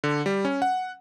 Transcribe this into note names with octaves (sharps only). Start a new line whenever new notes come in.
D3
G3
C#4
F#5